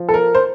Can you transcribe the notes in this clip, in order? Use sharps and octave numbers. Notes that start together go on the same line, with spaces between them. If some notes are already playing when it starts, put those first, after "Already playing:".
Already playing: F3
A4
A#4
C5